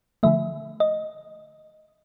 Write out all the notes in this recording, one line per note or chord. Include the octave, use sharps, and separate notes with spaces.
D3 F3 A3 E5
D#5